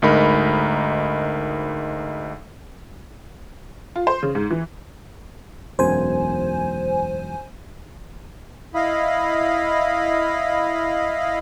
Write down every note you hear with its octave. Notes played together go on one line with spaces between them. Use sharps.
D2 G#2 D#4 A#4 B5
F4
C5
C#3
G#2
E3
E1 B1 F#2 C5 G#5
E4 D#5 F5 B5